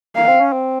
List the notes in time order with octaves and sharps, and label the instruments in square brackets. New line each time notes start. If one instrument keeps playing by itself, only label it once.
[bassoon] A#3 [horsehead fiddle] F5
[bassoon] C4
C#4
C4